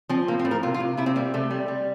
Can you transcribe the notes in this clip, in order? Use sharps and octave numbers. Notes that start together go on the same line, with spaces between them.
F3 C4
A2 A#3
C4
A2
A#4
C3 F4
F4
C3
C3 E4
C4
G3 A#3
C3 A3
G3
G3